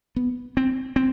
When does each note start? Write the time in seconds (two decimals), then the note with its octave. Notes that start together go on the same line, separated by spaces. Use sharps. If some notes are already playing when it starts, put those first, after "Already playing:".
0.16 B3
0.57 C4
0.96 C4